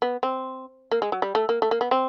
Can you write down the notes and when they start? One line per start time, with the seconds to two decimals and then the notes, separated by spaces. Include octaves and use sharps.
0.02 B3
0.23 C4
0.91 A#3
1.02 G#3
1.12 F#3
1.22 G3
1.35 A3
1.49 A#3
1.62 A3
1.71 A#3
1.81 B3
1.91 C4